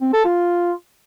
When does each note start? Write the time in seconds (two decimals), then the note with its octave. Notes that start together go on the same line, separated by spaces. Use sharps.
0.01 C4
0.13 A4
0.25 F4